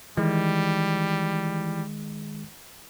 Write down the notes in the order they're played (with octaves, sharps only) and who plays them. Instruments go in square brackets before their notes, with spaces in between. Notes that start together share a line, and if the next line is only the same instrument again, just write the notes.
[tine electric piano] D#3 G#3 [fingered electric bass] E3 [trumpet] G3